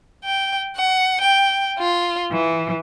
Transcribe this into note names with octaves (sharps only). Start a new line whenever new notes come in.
G5
F#5
G5
F4
E3